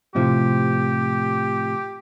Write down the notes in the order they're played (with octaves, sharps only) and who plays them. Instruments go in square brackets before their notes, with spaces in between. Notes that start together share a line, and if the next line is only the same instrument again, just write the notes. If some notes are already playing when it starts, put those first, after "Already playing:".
[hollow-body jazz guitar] A2 C3 F3 [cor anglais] G4